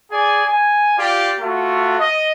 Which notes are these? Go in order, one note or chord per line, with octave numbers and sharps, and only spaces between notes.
G#4 D5 G#5
G#5
F4 G4 D5
A3 F4 F#4
D#5